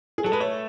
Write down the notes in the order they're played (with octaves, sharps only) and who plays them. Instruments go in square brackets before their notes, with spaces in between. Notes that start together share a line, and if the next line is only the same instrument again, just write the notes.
[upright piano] G#4
[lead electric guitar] F#3 [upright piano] A4
[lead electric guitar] G#3 [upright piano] B4
[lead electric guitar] A3 [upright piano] C#5